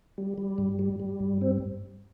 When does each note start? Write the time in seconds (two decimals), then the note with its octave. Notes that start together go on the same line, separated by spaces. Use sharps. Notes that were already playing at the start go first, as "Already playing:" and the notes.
0.18 G3
0.38 G3
0.58 G2
0.79 G3
1.00 G3
1.20 G2
1.41 C4